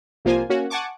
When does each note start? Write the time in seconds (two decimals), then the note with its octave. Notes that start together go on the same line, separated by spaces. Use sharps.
0.25 C2 F3 A#3 F4 C5 G#5
0.50 A#3 C#4 F#4
0.70 F#5 G#5 A5 C#6 D6